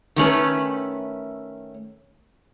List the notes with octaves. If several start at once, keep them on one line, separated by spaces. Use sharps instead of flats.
D#3 A3 C#4 B4